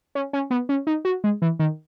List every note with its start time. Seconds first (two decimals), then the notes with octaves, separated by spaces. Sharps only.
0.15 C#4
0.33 C#4
0.51 B3
0.69 C#4
0.87 D#4
1.05 F#4
1.24 G#3
1.42 E3
1.59 D#3